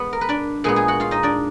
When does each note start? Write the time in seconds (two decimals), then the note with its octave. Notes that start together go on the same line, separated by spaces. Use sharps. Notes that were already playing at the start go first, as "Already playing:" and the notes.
Already playing: G#3 B3
0.13 A#4
0.21 B4
0.29 D4 D5
0.64 A#2 G#3 B3 G#4 G#5
0.76 G#4 G#5
0.88 F#4 F#5
1.00 F4 F5
1.11 D#4 D#5
1.23 D4 D5